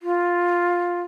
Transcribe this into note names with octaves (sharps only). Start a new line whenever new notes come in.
F4